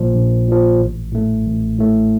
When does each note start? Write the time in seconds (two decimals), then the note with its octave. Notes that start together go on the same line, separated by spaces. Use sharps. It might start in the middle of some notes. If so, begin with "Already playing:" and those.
Already playing: A#1 A#2 F3
0.15 A#1
0.48 A#2 F3
0.80 A1
1.12 A2 A3
1.46 A1
1.78 A2 A3